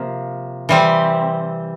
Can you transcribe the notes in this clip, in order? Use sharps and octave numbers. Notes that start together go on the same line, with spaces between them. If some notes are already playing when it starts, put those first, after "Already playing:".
Already playing: C3 F3 A#3
E3 G3 C4